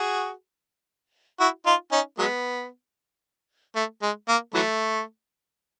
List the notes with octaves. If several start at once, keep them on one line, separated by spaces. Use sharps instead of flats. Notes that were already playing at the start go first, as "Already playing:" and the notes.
Already playing: F#4 G#4
E4 F#4
D#4 F4
C#4 D#4
F#3 G#3 B3
A3
G#3
A#3
E3 F#3 A3